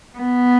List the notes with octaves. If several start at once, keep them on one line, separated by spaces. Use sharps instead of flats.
B3